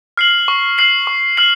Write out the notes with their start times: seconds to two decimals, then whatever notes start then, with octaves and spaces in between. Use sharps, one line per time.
0.17 F6 C7 F#7
0.48 C#6
0.78 F6 C7 F#7
1.07 C#6
1.37 F6 C7 F#7